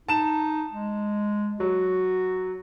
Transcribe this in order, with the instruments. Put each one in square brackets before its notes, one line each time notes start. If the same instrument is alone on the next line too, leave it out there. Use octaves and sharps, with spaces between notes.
[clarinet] D#4 [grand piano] A5 E7
[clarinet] G#3
[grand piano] F#3 [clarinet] F#4